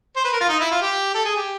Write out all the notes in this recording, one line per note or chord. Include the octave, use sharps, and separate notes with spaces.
C5
B4
A#4
F4
D#4
E4
F4
G4
A4
G#4
G4